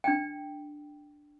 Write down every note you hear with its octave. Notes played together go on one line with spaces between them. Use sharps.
D4 G5